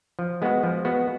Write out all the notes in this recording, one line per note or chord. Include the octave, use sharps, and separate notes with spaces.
F3
G#3 B3 F#4
F3
G#3 B3 F#4